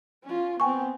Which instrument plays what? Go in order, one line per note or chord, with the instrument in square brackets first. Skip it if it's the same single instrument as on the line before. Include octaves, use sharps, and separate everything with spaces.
[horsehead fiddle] C#4 F4
[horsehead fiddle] B3 C4 [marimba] G5 G#5 C#6